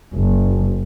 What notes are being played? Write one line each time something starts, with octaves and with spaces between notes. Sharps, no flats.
F#1